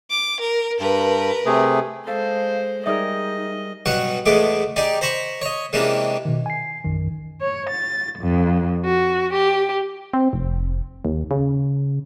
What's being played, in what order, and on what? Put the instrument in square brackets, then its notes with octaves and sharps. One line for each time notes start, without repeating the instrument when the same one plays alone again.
[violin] D6
A#4
[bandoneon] G2 [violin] A#4 B4
[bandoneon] C3 A3 G#4
[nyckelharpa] G#3 C5 [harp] A4 [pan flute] F5
[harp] G3 G#4 A#4 [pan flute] D#4 [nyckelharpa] D#5 [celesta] E5 D#6
[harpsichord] G2 B2 F#3 F#5 C#6
E2 G#3 A3 B3 G#4 D6
D#4 G4 G#4 D5
C5 A#5 B5 C#6
C#5 D#5
C3 E3 G#3 A#3 C#4 D4
[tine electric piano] B2 D#3
G#5 C7
A#1 F#2 D#3
[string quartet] C#5
A6
F2
F#4
G4
[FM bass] C4
F1
D#2
C#3